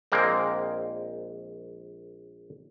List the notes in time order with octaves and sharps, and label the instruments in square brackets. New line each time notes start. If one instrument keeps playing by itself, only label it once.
[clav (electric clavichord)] A#1 G#3 A#3 C4